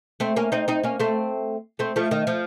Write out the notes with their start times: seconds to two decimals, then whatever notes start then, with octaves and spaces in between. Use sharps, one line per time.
0.20 A3 C4
0.36 A#3 C#4
0.52 C4 D#4
0.68 C4 D#4
0.83 A#3 C#4
1.00 A3 C4
1.79 A3 C4
1.96 F3 A3
2.11 D#3
2.27 F3